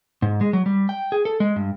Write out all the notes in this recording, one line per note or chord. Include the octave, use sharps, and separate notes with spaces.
G#2
G#3
F#3
G3
G5
G#4
A4
G#3
G2